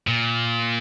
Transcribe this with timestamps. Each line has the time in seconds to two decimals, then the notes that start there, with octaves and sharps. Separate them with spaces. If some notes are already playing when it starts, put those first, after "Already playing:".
0.07 A#2